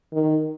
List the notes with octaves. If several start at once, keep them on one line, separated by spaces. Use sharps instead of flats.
D#3